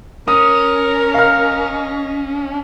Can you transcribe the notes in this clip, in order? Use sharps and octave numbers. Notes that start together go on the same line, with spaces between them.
C#4 A#4 D#6
D#5 F5 F6